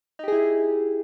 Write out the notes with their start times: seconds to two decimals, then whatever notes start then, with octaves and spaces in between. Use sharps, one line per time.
0.19 D#4
0.24 G4
0.28 G#4
0.32 E4